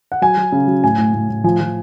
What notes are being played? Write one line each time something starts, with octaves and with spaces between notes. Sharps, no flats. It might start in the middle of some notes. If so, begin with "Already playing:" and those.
F#5
F#3 G#5
F#3
C#3
F#3
A2 G#5
A2
A2
A2
F3 G#5
F3